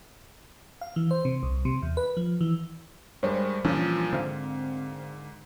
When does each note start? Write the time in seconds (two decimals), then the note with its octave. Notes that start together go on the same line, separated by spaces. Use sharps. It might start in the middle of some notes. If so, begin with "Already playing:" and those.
0.81 F5
0.96 E3
1.11 C5
1.25 C3
1.43 C2
1.65 C3
1.82 E2
1.97 B4
2.17 F3
2.41 E3
3.23 G2 G3 G#3 A#4 C5 D5
3.64 A#2 E3 F3 G3 C#4 D4 F4
4.13 G#2 D3 C4 F5